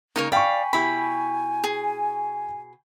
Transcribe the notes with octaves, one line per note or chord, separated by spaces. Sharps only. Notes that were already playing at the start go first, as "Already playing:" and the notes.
C#3 G#3 A#3 D#4 A#4 C#5
D5 F5 G5 G#5 B5 C#6
B2 E4 G4 B5
G#4